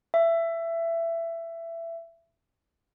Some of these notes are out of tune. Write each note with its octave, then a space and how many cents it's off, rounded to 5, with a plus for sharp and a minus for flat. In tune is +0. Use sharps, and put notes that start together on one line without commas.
E5 +20